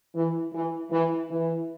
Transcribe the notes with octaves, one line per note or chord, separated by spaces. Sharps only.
E3
E3
E3
E3